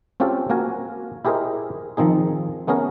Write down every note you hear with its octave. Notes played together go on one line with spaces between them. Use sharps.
C4 C#4 F4 G4 A4 C5
A#3 F#4 A#4 G#5
E4 G4 G#4 A#4 C5 D#5
D#3 F3 C4 D#4 G#4
A3 B3 C#4 G#4 A#4